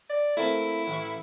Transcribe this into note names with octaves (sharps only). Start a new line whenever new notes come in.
D5
A3 A#3 C4 E4
A1 C#6